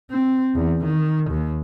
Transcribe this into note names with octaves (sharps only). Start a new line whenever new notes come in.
C4
E2
D#3
D#2